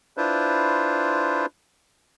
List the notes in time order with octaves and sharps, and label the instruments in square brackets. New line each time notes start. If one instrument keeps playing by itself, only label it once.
[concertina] D4 E4 F4 B4 C5